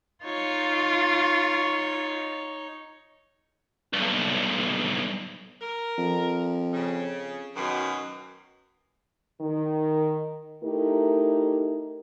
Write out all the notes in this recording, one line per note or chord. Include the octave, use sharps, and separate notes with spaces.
D#4 F4 C#5
B1 G2
A#4
F2
C#3
F#2 B2 D#3
D#3
A3 D#4 E4 G4 A#4